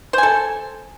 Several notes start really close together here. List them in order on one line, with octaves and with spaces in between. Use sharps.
C5 G#5 A4